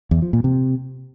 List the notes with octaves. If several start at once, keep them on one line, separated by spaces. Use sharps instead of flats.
E2
F3
A#2
C3